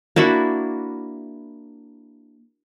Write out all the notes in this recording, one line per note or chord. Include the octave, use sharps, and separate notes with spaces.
A#3 D4 E4 F#4